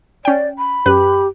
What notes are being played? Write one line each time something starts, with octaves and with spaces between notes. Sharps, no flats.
C#4 D5 G5
B5
F#2 G4 B4 F#6